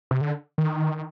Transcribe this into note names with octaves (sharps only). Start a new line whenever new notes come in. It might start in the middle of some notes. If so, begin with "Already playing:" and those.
C3
D3
D#3